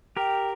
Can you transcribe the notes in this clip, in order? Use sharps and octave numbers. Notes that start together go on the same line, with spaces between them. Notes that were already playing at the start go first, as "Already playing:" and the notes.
G4 A#4 G5